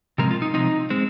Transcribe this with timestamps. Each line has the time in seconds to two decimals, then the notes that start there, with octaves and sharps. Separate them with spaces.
0.18 C3 F3 G#3 C4 A#4
0.31 F4
0.42 D#4
0.54 C3 F3 G#3 C4 D#4
0.90 G#3 C4